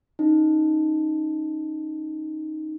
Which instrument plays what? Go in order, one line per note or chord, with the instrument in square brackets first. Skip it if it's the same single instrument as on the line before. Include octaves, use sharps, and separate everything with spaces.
[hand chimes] C#4 D#4